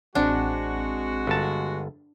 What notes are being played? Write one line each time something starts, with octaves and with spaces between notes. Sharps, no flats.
A1 G#3 C4 D4 F#4 F#5
G1 A5